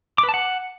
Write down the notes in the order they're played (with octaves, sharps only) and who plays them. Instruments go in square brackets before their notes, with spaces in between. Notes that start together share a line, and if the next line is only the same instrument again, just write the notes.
[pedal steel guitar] D6
B4
A5
F#5